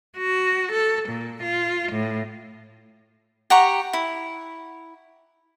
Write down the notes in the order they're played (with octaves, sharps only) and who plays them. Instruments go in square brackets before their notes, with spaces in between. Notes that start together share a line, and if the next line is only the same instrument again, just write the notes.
[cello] F#4
A4
A#2
F4
A2
[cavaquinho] G4 F#5 A#5 C#6
E4